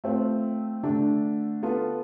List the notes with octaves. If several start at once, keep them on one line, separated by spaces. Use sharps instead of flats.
A3 C4 F4
D3 A3 D4
B3 F4 A4